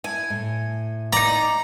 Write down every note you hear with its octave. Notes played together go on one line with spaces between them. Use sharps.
E4 G#5
A2
D#4 D5 A#5